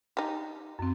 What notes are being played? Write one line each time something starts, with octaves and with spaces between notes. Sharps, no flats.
D#4 G4
F#2 C4